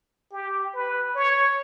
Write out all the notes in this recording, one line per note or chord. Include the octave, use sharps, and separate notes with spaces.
G4
B4
C#5